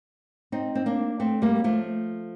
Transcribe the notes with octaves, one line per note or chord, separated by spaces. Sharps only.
C4 D#4
C4
A#3 D4
A3 C4
G3 A#3
F3 A3